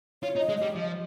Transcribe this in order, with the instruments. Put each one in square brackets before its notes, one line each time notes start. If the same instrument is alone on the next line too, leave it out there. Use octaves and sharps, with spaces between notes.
[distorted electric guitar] F4 [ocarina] C#5
[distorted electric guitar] D#4
[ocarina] D#5
[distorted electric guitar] G#3
[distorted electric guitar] G3 [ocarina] D#5
[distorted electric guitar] F3